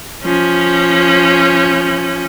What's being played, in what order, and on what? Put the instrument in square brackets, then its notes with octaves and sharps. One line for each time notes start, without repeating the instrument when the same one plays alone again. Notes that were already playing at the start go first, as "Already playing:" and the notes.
[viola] F3 C#4